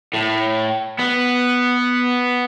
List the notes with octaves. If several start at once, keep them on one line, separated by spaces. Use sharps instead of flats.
A2
B3